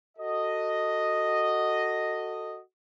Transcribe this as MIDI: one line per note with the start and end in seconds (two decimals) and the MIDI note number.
0.18 2.59 66
0.18 2.59 69
0.18 2.59 75